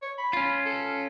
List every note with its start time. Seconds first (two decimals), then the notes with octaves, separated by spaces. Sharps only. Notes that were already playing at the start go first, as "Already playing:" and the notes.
0.02 C#5
0.18 B5
0.33 C#4 F4
0.65 A4